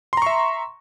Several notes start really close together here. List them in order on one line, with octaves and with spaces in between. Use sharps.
C6 A#5 C#6 E5